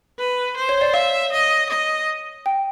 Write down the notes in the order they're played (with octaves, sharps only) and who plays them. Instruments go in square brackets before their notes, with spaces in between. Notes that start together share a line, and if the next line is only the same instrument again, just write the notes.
[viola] B4
C5
[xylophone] C#5
D5
[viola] E5 [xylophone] F5
[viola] D#5
D#5
[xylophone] G5